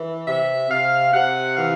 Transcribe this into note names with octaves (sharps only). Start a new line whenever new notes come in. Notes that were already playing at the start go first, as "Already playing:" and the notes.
Already playing: E3
C3 E5
C3 F5
C3 F#5
E3 F5